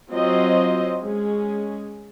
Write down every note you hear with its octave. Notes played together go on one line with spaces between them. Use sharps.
F#3 C4 F4 C5 D#5
G#3 C#4 G#4